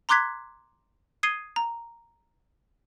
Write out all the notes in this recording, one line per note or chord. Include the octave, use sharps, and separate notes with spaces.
A#5 C6 D6 F#6 G#6 B6
D#6 G#6 C7 D#7 G7
A#5